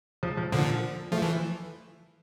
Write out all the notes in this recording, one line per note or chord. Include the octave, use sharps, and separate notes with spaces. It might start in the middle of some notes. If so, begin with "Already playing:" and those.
F3
F3
A#2 D3 F3
F3 A3
E3